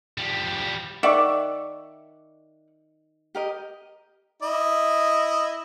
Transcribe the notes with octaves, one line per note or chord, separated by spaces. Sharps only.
F3 G3
D#3 D5 E5 F#5 C#6 D6
G4 A#4 D#5
E4 D#5